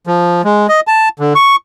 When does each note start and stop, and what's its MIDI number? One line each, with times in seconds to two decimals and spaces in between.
0.07 0.42 53
0.45 0.67 56
0.69 0.80 75
0.87 1.09 81
1.20 1.33 50
1.35 1.56 85